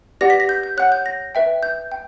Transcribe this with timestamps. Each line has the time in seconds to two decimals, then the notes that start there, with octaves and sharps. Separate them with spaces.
0.21 G4 B4 D5 F#5 A#6
0.30 B6
0.40 A#6
0.49 G6
0.63 G6
0.77 C#5 F#5 F#6
0.92 G6
1.06 A#6
1.35 B4 E5 G5
1.63 G6
1.92 G5